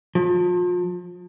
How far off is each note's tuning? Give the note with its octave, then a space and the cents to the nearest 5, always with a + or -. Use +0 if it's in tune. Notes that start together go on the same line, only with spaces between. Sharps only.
F3 +35